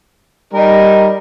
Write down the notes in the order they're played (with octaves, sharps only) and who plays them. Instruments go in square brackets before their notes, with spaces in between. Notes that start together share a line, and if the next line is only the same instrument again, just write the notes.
[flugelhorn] G3 [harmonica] D#4 A#4